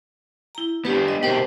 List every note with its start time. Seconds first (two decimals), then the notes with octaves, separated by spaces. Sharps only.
0.55 E4 A#5
0.85 B3 D4 G4 B4
1.08 D#5
1.23 B2 D#4 G4 A#4 C5